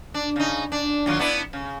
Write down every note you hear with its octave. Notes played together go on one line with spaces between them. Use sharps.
D4
C#3 D#4
D4
D#2 F#3 F4
B3 D4 E4
C#3